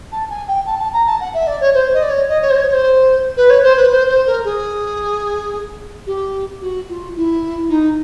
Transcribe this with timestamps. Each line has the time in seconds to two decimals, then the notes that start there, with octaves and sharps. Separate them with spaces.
0.12 A5
0.29 G#5
0.47 G5
0.66 A5
0.79 A5
0.93 A#5
1.07 A5
1.20 F#5
1.34 E5
1.47 D5
1.60 C#5
1.74 C5
1.94 D#5
2.02 D5
2.10 C#5
2.29 D#5
2.42 C#5
2.50 C5
2.55 C#5
2.68 C#5
2.73 C5
3.37 B4
3.50 C#5
3.63 C5
3.77 B4
3.91 C5
4.08 C5
4.27 A#4
4.44 G#4
6.06 G4
6.61 F#4
6.89 F4
7.16 E4
7.69 D#4